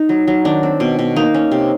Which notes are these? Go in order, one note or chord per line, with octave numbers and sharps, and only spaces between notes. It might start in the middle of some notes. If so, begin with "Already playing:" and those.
Already playing: D#4
F#3
F#3
D#3 D4
C4
B2
B2
A#3 D#4
C#4
C3